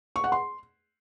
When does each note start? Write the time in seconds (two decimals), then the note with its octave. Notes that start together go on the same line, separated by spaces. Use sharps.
0.16 C#6
0.24 F#5
0.32 C6